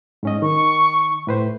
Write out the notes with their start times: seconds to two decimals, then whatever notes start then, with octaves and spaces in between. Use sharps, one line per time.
0.23 G#2 C#4 D#5
0.42 D#3 C#6
1.27 A2 B4 C5